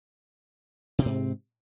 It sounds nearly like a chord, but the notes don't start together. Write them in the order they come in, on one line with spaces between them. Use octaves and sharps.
C3 C4 G#2